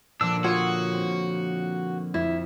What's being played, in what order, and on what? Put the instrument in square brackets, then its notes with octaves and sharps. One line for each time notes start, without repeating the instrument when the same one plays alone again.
[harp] A#2 F3 [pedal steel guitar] D3 A#3 E6 [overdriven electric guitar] D4
[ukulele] F4 C#5 F#5 [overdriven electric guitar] F#4 [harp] D#6 G#6
[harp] C4
[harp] F2 [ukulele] E4